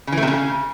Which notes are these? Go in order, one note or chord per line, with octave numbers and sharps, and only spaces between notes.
C#3
E3
A3
C3
C#3